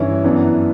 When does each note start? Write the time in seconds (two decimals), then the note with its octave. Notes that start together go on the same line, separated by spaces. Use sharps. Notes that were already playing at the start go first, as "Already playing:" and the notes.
Already playing: G2 E3 C#4 E4
0.24 F#2 E3 B3 D4